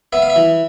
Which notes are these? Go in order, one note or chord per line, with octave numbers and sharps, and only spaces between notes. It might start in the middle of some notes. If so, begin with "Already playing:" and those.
B3 E5
F5
E5
E3